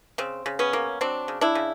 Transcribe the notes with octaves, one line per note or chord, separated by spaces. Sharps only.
C#3 C4
C#3
B3 C#4
A#3
F#3 C4 D4
C#3
D4 E4
C#3